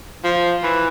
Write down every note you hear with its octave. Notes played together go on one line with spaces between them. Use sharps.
F3
E3